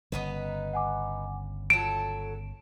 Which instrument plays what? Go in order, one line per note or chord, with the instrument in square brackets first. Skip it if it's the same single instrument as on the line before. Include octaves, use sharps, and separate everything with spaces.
[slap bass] G1 C#3 [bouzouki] B3 D#4 B4
[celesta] F#5 G#5 D6
[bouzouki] F#3 A4 [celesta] F4 E7 [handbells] D7